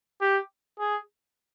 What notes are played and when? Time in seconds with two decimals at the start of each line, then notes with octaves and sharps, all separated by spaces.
0.21 G4
0.79 G#4